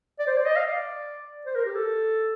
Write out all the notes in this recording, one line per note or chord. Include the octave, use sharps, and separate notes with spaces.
D5
C5
D5
D#5
F5
D5
C5
A#4
G4
A4